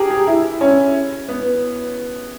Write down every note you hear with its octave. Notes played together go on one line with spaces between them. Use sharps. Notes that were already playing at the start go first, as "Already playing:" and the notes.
Already playing: G4 G#4 A#4
G4
E4
C#4
B3